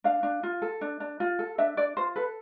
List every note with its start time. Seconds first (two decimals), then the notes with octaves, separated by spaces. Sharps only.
0.04 D4 F5
0.23 D4
0.43 F4
0.62 A4
0.81 D4
1.00 D4
1.20 F4
1.39 A4
1.58 D4 E5
1.77 D4 D5
1.97 F4 C5
2.16 A4 B4